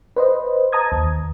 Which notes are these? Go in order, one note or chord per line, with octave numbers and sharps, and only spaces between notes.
B4 C5 D#5
A5 A#5 D#6 G#6
D#2